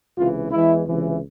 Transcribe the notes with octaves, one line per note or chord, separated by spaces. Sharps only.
C#2 C3 E3 F4
E2 E3 G#3 E4
C#2 C3 E3